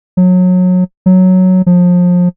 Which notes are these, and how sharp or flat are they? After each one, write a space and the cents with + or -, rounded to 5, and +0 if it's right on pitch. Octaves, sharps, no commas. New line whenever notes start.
F#3 -25
F#3 +0
F3 +30